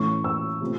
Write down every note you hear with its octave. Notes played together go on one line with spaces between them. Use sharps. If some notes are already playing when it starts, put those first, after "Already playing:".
Already playing: A2 E3 A3 C#4 C#6
E6
C3 F3 A3 C4